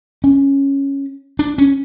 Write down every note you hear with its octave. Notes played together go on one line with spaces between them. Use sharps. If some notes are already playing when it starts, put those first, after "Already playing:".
C#4
D4
C#4